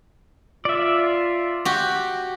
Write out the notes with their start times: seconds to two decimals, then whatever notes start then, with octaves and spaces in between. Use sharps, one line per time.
0.65 F4 D5 E5
1.65 F#4 G4